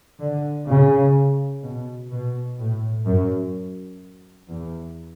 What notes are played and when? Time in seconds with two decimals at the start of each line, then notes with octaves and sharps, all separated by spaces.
0.20 D3
0.67 C#3
1.63 B2
2.11 B2
2.59 A2
3.06 F#2
4.49 E2